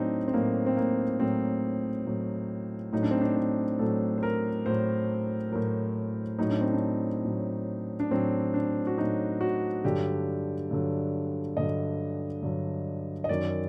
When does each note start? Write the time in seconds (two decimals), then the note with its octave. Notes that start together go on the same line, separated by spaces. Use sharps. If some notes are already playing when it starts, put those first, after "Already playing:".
Already playing: A2 F#3 C4 D4 D#4
0.28 C4
0.33 A2 F#3 A#3
0.66 C4
0.77 A#3
1.20 A2 F#3 C4
2.06 A2 F#3
2.93 A2 F#3 D#4
3.03 D4
3.11 C4
3.21 D4
3.36 C4
3.79 A2 F#3 A4
4.18 C5
4.23 A#4
4.66 A2 F#3 C5
5.52 A2 F#3 A#4
6.39 A2 F#3 D#4
6.50 D4
6.61 C4
6.73 D4
7.25 A2 F#3
8.00 D4
8.11 A2 F#3 C4
8.54 D4
8.87 F#4
8.97 A2 F#3 D#4
9.41 F#4
9.84 G2 D3 F#3 G4
10.71 G2 D3 F#3
11.56 G2 D3 F#3 D#5
12.42 G2 D3 F#3
13.24 D#5
13.29 F#2 D#3 F#3 D5